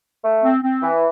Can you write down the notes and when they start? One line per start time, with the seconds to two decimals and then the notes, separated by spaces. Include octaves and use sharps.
0.22 A3
0.42 C4
0.62 C4
0.81 E3